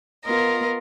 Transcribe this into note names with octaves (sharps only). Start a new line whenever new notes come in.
B3 F4 A#4 D#5